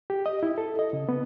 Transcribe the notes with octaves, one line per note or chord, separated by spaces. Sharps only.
G4
D#5
E4
A4
D#5
C#3
B3